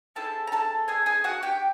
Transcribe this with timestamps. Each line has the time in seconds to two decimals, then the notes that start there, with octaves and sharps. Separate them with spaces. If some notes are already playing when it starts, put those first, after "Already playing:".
0.16 C4 E4 G#4 A4 A5
0.47 A#5
0.52 A4 A5
0.88 G#4 G#5
1.06 G#4 G#5
1.24 F#4 F#5
1.43 G4 G5